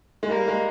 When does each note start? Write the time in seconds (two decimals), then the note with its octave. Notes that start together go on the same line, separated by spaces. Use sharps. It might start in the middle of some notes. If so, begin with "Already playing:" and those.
0.23 G#3
0.29 G3 A#3 A#4
0.48 G#3